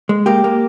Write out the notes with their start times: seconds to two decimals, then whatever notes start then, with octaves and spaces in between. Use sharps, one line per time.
0.09 G#3
0.26 A#3 G4
0.44 A#3